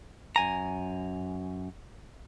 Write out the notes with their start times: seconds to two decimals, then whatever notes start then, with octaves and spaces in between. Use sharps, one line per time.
0.36 F#2 G#5 A#5